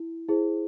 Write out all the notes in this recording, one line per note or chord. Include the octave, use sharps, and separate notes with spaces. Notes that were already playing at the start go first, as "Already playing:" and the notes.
Already playing: E4
E4 G#4 C5